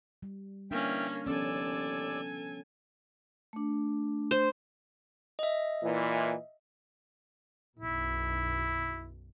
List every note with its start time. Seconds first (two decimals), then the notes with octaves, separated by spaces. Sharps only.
0.23 G3
0.71 E3 A#3 C#4 D4 E5 G5
1.27 D#2 F3 B3 C#4 A4 D5 G#5 E6
3.53 A3 D4
4.31 C5
5.39 D#5 E5
5.84 A#2 E3
7.79 B1 F#2 B2 E4